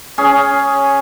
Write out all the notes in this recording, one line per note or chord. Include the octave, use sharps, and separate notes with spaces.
C#4 G#4